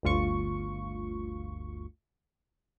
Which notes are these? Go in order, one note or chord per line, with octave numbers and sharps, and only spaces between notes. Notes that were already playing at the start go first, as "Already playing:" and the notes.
G1 D2 F4 C#6